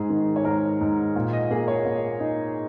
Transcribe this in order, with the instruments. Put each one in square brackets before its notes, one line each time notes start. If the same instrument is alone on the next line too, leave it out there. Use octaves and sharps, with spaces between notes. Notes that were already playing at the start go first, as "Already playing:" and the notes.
Already playing: [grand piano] G#2 [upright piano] G#4
[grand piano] D#3
[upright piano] C#5
[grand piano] G#2 [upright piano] A#4
[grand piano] G#2
A#2
[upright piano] D#5
[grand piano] A#3 [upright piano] G#4
[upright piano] C#5
[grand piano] A#3
D#4